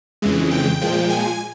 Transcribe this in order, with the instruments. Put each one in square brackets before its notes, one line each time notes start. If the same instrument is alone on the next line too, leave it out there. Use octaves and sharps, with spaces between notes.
[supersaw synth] F2 C#3 E3 G#3
G5
A#2 F3 G#3
G#5